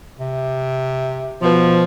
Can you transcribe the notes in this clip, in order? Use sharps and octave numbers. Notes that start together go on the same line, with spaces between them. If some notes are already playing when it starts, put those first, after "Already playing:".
C3
B2 F3